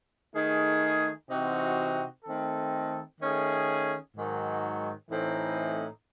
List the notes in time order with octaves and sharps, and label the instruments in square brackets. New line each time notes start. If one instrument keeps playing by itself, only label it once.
[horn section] D#3 A3 D#4 G#4
C3 E3 C4 D#4 F#4
D#3 A3 C4 D#4 A4
D#3 A3 C#4 G#4
G#2 D#3 F#3
A2 E3 A3 C4 D#4